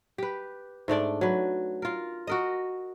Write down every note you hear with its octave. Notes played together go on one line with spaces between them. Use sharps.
G4 B4
G#2 A3 D4 D5
F#3 B4
F4 A#4
F#4 A#4 D#5